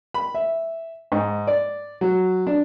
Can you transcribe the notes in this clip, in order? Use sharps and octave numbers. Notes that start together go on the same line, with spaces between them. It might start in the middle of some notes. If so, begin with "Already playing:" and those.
B5
E5
G#2
D5
F#3
D4